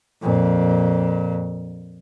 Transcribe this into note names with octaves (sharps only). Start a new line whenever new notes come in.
F2 A#2